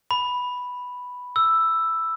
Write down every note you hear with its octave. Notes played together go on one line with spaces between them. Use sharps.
B5
E6